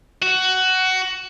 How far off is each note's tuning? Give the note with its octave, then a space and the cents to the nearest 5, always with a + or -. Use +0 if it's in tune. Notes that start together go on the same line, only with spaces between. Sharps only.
F#4 +15